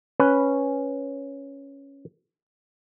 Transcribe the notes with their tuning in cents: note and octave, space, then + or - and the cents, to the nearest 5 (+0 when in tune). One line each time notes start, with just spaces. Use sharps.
C#4 +0 B4 +0